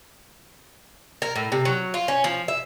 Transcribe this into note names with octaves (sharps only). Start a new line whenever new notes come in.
A#4
A2
C3
F#3
F4
C#4
F3
E5